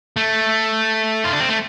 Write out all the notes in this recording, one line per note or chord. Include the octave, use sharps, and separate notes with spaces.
A3
F4
D4
C4
A3